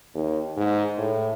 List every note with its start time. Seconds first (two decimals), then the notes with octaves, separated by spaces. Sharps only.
0.14 D#2
0.57 G#2
0.97 A2